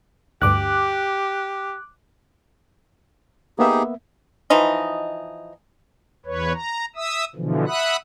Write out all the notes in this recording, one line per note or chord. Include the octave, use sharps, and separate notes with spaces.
D2 G2 G4 D6 F#6
A#3 B3 D#4 G4 G#4 E5
E3 F3 D#4 D#5
E2 B4 C#5
A#5
E5 D#6 E6
B2 D3 E3 F3
E5 F#5 B5 D#6 F#6